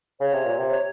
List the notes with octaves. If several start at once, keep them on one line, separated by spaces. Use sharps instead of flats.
C#3 C#5
C3
A#2
C3
C#5